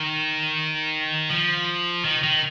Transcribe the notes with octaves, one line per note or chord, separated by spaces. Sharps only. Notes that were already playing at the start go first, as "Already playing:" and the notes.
Already playing: D#3
F3
D#3
D#3